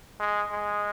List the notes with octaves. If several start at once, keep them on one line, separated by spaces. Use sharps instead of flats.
G#3
G#3